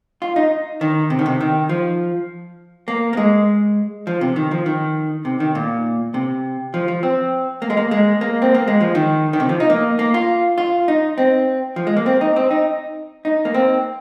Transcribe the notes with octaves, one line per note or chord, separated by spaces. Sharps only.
F4
D#4
D#3
C3
D#3
C3
D#3
F3
A#3
A#3
G#3
F3
C3
D#3
F3
D#3
C3
D#3
A#2
C3
F3
F3
C4
A#3
G#3
A#3
G#3
A#3
C4
A#3
G#3
F3
D#3
D#3
C3
F3
D#4
A#3
A#3
F4
F4
D#4
C4
F3
G#3
A#3
C4
D#4
C4
D#4
D#4
A#3
C4